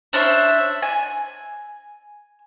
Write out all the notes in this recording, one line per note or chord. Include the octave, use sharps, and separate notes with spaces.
C#4 D4 C5 E5
G#5